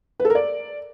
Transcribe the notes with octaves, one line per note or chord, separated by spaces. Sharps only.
B4
A4
A#4
D5